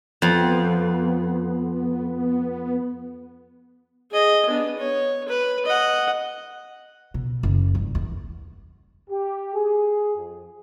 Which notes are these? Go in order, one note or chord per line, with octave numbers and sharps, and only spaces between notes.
F2 B3
G#4 D#5
B3 D4
C#5
B4
D#5 F#5
B2
F#1
G2
E2
G4
G#4
F2